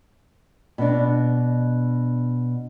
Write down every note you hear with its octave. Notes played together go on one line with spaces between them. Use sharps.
B2 D4